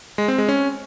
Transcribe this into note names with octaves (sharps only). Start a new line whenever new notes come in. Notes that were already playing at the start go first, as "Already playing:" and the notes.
G#3
C4
G#3
C#4